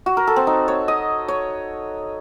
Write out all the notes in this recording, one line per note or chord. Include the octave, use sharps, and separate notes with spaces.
F#4
A#4
A4
C4
D#4
C#5
D#5
C#5